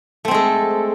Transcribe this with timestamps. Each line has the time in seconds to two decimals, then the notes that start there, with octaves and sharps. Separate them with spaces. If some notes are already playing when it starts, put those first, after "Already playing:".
0.25 A3
0.28 C4
0.31 G#3
0.34 A4